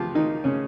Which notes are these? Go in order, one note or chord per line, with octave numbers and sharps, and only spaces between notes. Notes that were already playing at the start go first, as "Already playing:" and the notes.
Already playing: C#2 F3 F4 G4
D#3 D#4
C#3 C#4